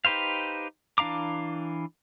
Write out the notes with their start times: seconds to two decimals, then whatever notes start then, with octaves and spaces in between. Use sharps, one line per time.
0.05 D#4 G4 B4 C5 F5
0.98 E3 D4 F5 A#5 D6